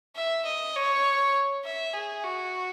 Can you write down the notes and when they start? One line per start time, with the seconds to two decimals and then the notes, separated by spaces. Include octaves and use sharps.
0.16 E5
0.45 D#5
0.75 C#5
1.65 E5
1.94 G#4
2.23 F#4